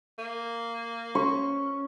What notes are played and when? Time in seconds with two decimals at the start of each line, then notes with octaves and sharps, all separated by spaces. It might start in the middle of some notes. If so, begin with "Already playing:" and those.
0.19 A#3
1.15 C#4 C#6